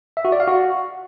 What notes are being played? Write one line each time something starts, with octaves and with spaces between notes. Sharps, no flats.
E5
F#4
D5
F5
F#4